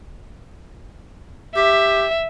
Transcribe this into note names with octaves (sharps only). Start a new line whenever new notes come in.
G4 E5